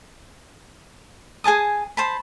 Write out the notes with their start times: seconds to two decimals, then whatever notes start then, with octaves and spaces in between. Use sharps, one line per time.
1.44 G#4 G#5 A5 D#6
1.97 C5 A5 B5